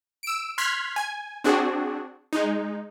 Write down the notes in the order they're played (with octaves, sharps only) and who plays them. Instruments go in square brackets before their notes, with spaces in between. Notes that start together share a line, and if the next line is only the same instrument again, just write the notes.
[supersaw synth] E6 D7
C6 F6 F#6 G#6 B6
G#5
C4 D4 F#4 G#4
G#3 D#4